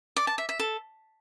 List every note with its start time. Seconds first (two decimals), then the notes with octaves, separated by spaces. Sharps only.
0.16 D5
0.27 A5
0.38 E5
0.49 E5
0.59 A4